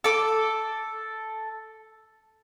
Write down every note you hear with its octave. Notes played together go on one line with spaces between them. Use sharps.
A4 D6